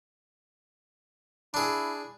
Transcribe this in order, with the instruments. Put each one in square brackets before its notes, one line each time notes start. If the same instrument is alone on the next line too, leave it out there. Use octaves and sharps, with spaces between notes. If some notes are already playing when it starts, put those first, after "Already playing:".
[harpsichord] D4 G#4 [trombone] E4